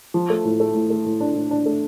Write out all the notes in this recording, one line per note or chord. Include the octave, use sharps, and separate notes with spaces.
F3
A3
A2
A3
A2
A3
A2
D4
A2
D4
A3